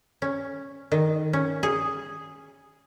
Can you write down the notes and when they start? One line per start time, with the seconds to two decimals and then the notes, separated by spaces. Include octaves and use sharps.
0.22 C#4
0.92 D#3
1.33 C#4
1.63 G#4